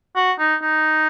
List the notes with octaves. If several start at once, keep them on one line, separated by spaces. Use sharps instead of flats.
F#4
D#4
D#4